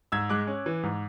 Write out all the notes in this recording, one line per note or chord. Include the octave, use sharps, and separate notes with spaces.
G#2 E6 G#6
G#3 D6 F#6
C#4
E3
G#2